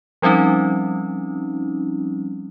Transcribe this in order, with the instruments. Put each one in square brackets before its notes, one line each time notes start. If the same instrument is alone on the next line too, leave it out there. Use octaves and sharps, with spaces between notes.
[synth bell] F3 G3 C4 C#4 D#4